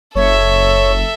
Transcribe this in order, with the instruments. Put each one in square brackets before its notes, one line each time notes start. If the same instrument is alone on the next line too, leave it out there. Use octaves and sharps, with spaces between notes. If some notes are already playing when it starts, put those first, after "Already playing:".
[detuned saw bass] F#1 [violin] A4 E5 [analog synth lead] C#5